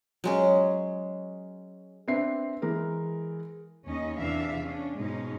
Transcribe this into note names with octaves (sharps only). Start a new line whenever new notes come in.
F#3 G#3 C#4
C4 D4 B4 E5 C7
E3 G#3 A#4
D#2 C#4 D#4 D#5
E2 C3 E3 D4 E5 F5
C#4 D4
G#2 B2 G#3 C#4 D#4